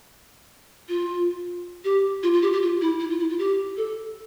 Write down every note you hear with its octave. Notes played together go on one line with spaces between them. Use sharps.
F4
G4
F4
F4
G4
G4
F4
E4
E4
F4
E4
F4
G4
A4